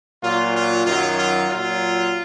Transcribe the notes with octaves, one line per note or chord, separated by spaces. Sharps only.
A#2 F#3 F4
F4
F#2 D#3 F#3 F4
F4
A#2 F#3 F4